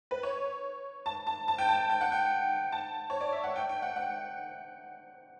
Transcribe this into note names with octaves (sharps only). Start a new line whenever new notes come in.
B4
C#5
A5
A5
A5
G5
A5
G5
F#5
G5
A5
C#5
D5
E5
F#5
G5
G5
F#5
F#5